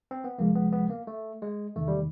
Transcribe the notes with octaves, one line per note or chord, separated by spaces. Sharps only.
C4
B3
D2 C3 F3 G#3 A#3
B3
B3
A#3
A3
G#3
E2 C3 D#3 A3
G3